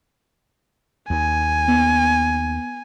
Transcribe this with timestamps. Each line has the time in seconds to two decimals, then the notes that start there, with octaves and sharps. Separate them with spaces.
1.10 D#2 G#5
1.68 B3